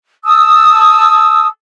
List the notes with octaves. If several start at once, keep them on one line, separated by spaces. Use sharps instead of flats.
A5 D#6 E6